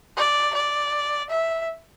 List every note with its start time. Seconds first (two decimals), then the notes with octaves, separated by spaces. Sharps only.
0.17 D5
0.55 D5
1.30 E5